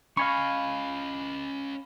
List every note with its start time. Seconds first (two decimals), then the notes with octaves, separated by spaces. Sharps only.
0.17 C#4 D#5 F5 G#5 B5 C#6